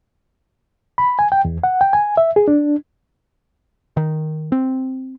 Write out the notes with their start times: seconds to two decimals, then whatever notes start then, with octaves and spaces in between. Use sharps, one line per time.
0.98 B5
1.19 G#5
1.32 G5
1.45 E2
1.64 F#5
1.81 G5
1.93 G#5
2.17 E5
2.36 G#4
2.48 D4
3.97 D#3
4.52 C4